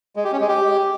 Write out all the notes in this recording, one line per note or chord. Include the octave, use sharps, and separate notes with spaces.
G#3
G4
C#4
G#3
G4